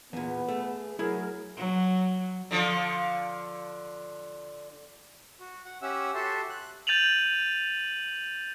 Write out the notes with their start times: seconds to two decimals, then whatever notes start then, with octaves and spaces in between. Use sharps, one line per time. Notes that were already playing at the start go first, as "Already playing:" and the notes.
0.13 E2 A#2 B3 B4
0.49 A3 G#4
0.99 F#3 A3 E4 G#4 A#4 B5
1.57 F#3
2.51 D3 F3
5.40 F#4
5.65 F#5
5.82 C#4 G4 E5 F#5 E6
6.15 F#4 G4 A4 E5 A5 C6
6.50 F#6
6.87 G6 A6 D#7 F7 F#7